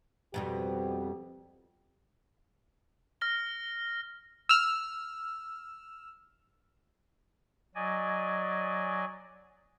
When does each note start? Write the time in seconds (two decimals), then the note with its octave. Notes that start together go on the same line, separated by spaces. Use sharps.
0.34 F2 B2 G3 G4
3.21 F6 A#6 G7
4.49 E6 F6
7.75 F#3 D5 D#5 G#5